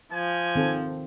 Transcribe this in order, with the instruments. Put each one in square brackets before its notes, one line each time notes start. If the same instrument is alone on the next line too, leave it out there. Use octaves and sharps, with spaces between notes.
[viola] F3 [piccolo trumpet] G#5
[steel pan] D#3 C4 A4